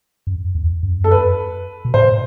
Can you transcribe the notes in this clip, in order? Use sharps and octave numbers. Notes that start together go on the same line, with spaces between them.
F#2
E2
F#2
A4
B4
B2
A2 C5